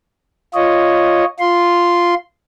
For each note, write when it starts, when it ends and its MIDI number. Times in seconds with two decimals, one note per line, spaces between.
0.54 1.25 65
0.54 1.25 73
0.54 1.25 75
1.40 2.14 65
1.40 2.14 84